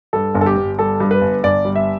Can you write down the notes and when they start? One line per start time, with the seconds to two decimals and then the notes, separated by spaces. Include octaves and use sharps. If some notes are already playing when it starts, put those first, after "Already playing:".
0.13 G2 A4
0.34 G1
0.41 A4
0.46 G4
0.57 G1
0.79 G3 A4
1.00 G2
1.11 B4
1.21 G1
1.44 G1 D5
1.65 G3
1.76 E5